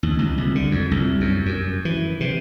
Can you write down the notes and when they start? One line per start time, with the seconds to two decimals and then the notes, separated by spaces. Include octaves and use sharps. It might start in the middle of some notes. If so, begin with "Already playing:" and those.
0.03 D#2
0.19 C#2
0.38 C2
0.55 D3
0.71 F2
0.91 C2
1.21 F#2
1.46 F#2
1.85 E3
2.20 C3